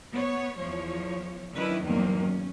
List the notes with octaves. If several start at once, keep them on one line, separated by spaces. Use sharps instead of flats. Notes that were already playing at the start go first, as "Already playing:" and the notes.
B3 C#5
E2 F3 C#5
D#3 F#3 C#4 D4 E4 B4
E2 G2 D#3 F#3 A#3 C4
C#4